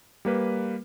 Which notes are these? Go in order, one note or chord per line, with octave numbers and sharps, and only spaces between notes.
G3 A#3 B4